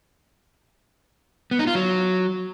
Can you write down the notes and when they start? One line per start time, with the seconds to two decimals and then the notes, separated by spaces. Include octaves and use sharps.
1.51 B3
1.59 D#4
1.67 F4
1.75 F#3